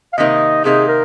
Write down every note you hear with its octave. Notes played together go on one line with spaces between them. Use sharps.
F5
C3 D#3 A#3 D#4 D#5
C3 D#3 A#3 D#4 G#4
A#4